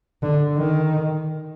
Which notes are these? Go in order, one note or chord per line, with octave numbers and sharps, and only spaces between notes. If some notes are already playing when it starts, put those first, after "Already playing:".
D3
D#3